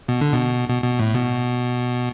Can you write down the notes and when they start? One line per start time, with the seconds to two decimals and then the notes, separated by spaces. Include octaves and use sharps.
0.09 B2
0.21 D3
0.32 B2
0.69 B2
0.83 B2
0.99 A2
1.15 B2